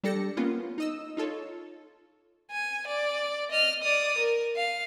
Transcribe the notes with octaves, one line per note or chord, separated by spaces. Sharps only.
G3 D4 G4 A4 A#6 C#7
A#3 B3 C#4 F4
D#4 D#5 E6
D#4 F4 A4 C#5
G#5
D5
D#5 F6
D5 D#6
A#4
F5